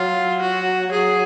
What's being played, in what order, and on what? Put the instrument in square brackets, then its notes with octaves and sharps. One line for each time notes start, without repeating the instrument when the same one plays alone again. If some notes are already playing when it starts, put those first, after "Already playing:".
Already playing: [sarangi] F#3 [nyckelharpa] F4
[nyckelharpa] F#4
[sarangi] F#3 [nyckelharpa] G#4